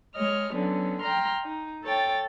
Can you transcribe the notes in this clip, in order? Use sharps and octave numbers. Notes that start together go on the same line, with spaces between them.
G#3 C#5 D#5 F6
D3 F#3 B3 C#4
G5 A#5 C6 F6
D#4
A4 C#5 G5 A6